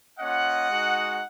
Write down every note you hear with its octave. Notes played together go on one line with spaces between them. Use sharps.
A#3 C#4 F4 D#5 F#5
G#3 D#4 F#4